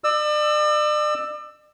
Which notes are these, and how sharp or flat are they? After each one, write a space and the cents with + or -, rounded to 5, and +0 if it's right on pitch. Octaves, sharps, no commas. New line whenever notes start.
D5 +40 E6 +5